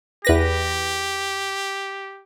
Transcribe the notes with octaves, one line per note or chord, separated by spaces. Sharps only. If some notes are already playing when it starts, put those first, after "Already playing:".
E2 G4 B4 A#6